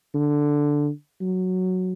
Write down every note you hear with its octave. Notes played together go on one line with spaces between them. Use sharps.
D3
F#3